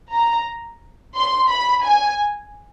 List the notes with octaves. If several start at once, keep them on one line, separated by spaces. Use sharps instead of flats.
A#5
C6
B5
G#5